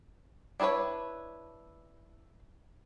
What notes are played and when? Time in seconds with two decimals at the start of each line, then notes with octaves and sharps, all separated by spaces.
0.60 D4 E4 G#4 B4 C#5